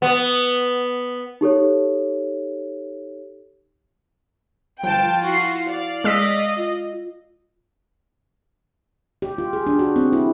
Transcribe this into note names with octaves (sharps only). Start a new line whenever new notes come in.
B3
D#4 G4 A4 C#5
G1 F3 F4 G5 A5
E4 F#4 C7
D5 F5
G#3 D#5 E6 B6
F4
G4
F4
G#4
D4
F#4
C4
E4